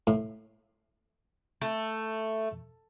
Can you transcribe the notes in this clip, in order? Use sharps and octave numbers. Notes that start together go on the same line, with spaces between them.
A2
A3